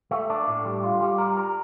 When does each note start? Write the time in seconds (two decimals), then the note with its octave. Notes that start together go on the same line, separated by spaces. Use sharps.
0.11 A3
0.30 D4
0.48 A2
0.65 G3
0.84 F4
1.01 G3
1.18 A#4
1.37 A#4